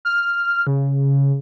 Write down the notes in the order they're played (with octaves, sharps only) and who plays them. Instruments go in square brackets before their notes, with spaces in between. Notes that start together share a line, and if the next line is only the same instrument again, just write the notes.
[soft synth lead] F6
C#3